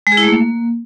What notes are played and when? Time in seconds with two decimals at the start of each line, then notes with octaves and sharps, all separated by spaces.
0.07 G#3
0.12 G#4
0.17 E4
0.23 A3
0.28 A#3